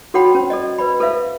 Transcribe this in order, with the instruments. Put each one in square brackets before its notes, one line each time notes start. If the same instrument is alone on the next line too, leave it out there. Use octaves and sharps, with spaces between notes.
[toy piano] F#4 A4 C#5 F#5 G5 B5
C#4 C5
A4 D5 D#5
B4 C5 D5 B5
A4 B4 C5 E5 F5